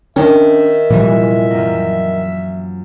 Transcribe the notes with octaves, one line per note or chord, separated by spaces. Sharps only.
D#3 C#4 D4 E5
F1 A#2 E3 F3 G3
F#2 A#3